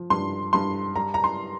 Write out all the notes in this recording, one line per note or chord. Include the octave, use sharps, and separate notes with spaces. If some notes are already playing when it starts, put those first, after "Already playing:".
Already playing: F3
G2 C6
G2 C6
G3 A#5
A#5
C6